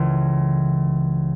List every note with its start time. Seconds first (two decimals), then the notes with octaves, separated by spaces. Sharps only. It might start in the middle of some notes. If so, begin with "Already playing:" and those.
Already playing: C#2 C#3 E3